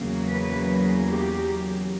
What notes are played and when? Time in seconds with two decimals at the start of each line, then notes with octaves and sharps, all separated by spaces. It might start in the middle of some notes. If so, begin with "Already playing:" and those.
Already playing: E2 C#3 F#3 A#3
0.27 B4
1.07 G4